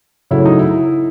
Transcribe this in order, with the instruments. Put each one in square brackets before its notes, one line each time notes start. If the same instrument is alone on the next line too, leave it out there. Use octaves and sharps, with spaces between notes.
[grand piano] C#3 F#3 A3 [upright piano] E4
[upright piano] D#4
E4